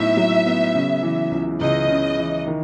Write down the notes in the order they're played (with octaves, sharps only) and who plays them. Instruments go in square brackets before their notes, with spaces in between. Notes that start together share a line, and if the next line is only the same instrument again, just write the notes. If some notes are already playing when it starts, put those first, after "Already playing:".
Already playing: [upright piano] A2 F#3 B3 D#4 [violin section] E5
[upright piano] F#3
B3
C#3
E3
C#2
[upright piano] C#2 [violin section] D#5
[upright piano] C#3
E3
D#3